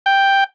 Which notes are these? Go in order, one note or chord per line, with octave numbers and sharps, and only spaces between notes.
G5